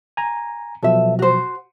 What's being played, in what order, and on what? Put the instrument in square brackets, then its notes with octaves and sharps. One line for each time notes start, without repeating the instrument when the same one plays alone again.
[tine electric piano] G#5 A#5
[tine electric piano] B2 F3 F#3 [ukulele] A4 E5
[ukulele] F#4 C5